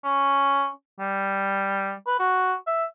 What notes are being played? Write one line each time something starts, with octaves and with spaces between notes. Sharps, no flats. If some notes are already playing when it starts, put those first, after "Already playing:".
C#4
G3
B4
F#4
E5